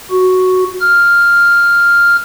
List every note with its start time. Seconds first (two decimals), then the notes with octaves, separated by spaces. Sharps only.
0.11 F#4
0.81 F6